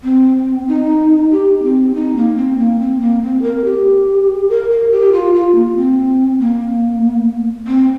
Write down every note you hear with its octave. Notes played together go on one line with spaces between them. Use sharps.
C4
D#4
G4
C4
D#4
A#3
C4
A#3
C4
A#3
C4
A#4
G4
A#4
A#4
G4
F4
F4
A#3
C4
A#3
C4